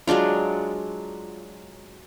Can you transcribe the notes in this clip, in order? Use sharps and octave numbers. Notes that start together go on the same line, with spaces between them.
F#3 G#3 D4 F4